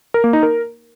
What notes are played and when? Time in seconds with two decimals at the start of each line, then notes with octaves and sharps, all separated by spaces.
0.14 A#4
0.24 A#3
0.33 D#4
0.43 A#4